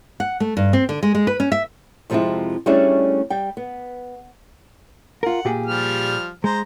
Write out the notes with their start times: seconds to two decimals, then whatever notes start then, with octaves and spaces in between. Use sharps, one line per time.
0.20 F#5
0.40 A3
0.57 G2
0.73 C4
0.89 D3
1.03 G#3
1.15 G#3
1.27 B4
1.40 C#4
1.52 E5
2.10 F2 C3 F3 G#3 C4 E4
2.66 G3 A3 C#4 D4 E4 G#4
3.30 G3 G5
3.57 B3
5.23 F4 A#4 F#5
5.45 A#2 G4 G#4
5.66 F3 G3 F6
6.44 G#3 C5 A#5